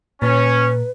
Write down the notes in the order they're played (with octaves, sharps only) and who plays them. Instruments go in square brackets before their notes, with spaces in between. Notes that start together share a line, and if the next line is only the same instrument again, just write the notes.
[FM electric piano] A#2 [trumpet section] C#4 [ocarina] B4